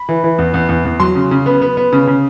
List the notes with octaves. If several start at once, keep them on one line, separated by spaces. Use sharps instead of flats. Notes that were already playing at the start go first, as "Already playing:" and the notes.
Already playing: B5
E3
E3
E2
E2
E2
E2
F#3 C6
C#3
C#3
B3
B3
B3
C#3
C#3